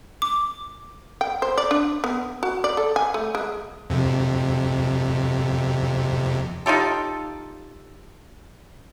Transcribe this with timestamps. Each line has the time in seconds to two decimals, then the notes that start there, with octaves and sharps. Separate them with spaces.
0.22 D6
1.21 G5
1.42 C5
1.58 D5
1.71 D4
2.04 B3
2.43 F#4
2.64 D5
2.77 A4
2.96 G#5
3.14 A3
3.35 G#3
3.90 F2 C3
6.66 D#4 F4 G4 A4